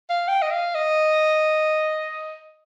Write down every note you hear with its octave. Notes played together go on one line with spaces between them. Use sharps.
F5
G5
D#5
F5
D#5